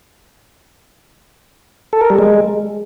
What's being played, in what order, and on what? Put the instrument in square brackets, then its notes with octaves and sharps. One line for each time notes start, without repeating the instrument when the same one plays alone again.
[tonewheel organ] A4
A#4
G3
G#3